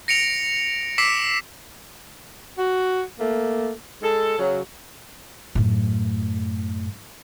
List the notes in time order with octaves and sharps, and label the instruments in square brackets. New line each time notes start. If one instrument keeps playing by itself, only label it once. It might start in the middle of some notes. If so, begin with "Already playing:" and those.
[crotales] A#6 C#7 D7 F7
D6 E6 B6 C7 D7 E7
[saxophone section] F#4
A3 A#3
G#3 A4
C#3 F#3
[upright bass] F#2 A2